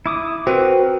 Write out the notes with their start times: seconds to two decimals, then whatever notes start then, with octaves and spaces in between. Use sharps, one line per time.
0.06 E4 D6 D#6
0.47 C4 F#4 A#4 B4